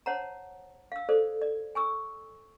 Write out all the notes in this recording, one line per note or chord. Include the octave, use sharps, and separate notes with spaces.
C5 C#5 F#5 A5 A#5
F5 E6
A4 C5 D5
D5
G#5 C#6 E6